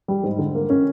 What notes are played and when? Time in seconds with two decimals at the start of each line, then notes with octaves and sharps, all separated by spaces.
0.08 G3
0.24 G#2
0.39 D3
0.55 A#3
0.70 C#4